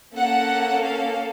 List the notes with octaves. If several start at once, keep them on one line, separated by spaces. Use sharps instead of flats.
A#3 C#4 A4 F#5
F5